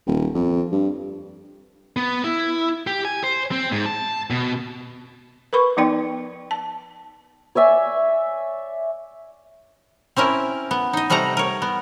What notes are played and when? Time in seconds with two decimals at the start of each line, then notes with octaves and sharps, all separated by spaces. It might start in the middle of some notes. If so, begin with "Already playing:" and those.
0.07 D#1
0.35 F2
0.72 G2
1.97 B3
2.24 E4
2.87 G4
3.05 G#5
3.23 C5
3.51 C4
3.72 G#2
3.86 A5
4.30 B2
5.53 A#4 B4 B5 C#6
5.77 F3 B3 D#4 D5 G5
6.51 A5
7.55 C#5 D5 E5 G#5
10.16 C4 C#4 E4 A#4
10.71 B3
10.93 D#4 D#5
11.10 C3 G3 A3 F#5 A#5
11.37 A#4 C#5
11.62 B3